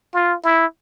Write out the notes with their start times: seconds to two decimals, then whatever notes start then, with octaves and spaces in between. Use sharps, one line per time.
0.14 F4
0.44 E4